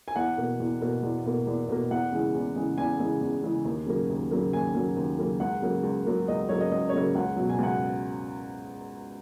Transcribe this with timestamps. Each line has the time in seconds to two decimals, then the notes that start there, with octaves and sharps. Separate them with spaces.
0.08 G#5
0.16 E2 F#5
0.37 B2 A#3
0.60 E2
0.81 B2 A#3
1.03 E2
1.25 B2 A#3
1.47 E2
1.69 B2 A#3
1.91 E2 F#5
2.12 C#3 E3 G#3
2.35 E2
2.55 C#3 E3 G#3
2.78 E2 G#5
3.00 C#3 E3 G#3
3.21 E2
3.43 C#3 E3 G#3
3.65 D#2
3.87 C#3 F#3 A#3
4.10 D#2
4.31 C#3 F#3 A#3
4.53 D#2 G#5
4.74 C#3 F#3 A#3
4.96 D#2
5.19 C#3 F#3 A#3
5.40 C#2 F#5
5.62 C#3 F#3 A#3
5.83 C#2
6.06 C#3 F#3 A#3
6.28 C#2 D#5
6.49 C#3 F#3 A#3 C#5
6.60 D#5
6.71 C#2 D#5
6.89 C#5
6.93 C#3 F#3 A#3 D#5
7.14 C#2 F#5
7.36 B2 F#3
7.49 G#5
7.59 C#2 F#5